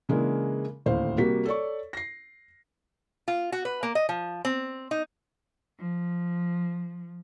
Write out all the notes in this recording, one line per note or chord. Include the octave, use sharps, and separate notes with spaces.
C#3 E3 G#3 A#3 D4
D#1 D2 A2 C5 F5
C3 G3 A#3 F#4 B6
A4 C#5 D5 C#6
A#6 C7
F4
F#4
B4
A#3
D#5
F3
C4
D#4
F3